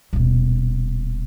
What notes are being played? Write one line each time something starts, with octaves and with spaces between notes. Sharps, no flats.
D#1 B2